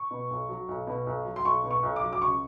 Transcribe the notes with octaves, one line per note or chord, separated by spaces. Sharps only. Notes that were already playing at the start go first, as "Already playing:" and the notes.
Already playing: C#6
B2
B1
F#3
B1
B2
B1
F#3
C6
B1 C#6
B2
C#6
B1
D6
F#3
D6
C#2 C#6